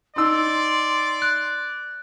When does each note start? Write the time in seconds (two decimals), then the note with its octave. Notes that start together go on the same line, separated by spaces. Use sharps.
0.16 D#4 D5 C6 E6
1.22 F#6